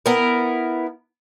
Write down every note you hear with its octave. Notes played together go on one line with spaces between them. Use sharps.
B3 E4 A#4